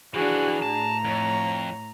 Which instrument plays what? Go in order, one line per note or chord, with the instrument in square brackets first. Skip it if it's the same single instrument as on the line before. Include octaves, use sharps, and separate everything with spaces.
[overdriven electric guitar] E3 F3 [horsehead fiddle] D4 G#4 [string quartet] F#4
[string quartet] A2 A#5 [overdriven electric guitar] A5
[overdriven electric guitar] F2 [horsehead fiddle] C#5